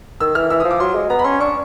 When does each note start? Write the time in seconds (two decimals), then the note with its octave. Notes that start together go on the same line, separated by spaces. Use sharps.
0.20 D#3 E6
0.35 E3 F6
0.50 E3 E6
0.60 D#6
0.65 F3
0.71 D6
0.80 F#3 C6
0.95 G#3
1.10 B3 A#5
1.19 B5
1.24 C#4 C6
1.40 D4 C#6